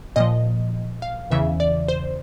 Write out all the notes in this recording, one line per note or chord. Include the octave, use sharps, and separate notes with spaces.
A#2 F3 D#5
F5
E2 C#3 E3 E5
D5
C5